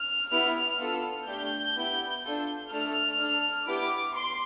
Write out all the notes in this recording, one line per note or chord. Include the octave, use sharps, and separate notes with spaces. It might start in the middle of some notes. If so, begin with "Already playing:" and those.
Already playing: F6
B3 E4 G4
B3 D4 F4 A4
A3 D4 G4 G6
B3 E4 G4
D4 F4 A4
A3 D4 A4 F6
D4 A4
B3 E4 G4 D6
C6